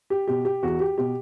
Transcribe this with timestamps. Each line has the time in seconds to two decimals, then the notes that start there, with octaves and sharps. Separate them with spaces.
0.10 G4
0.28 B2 G4
0.45 G4
0.63 E2 F#4
0.80 G4
0.98 B2 G4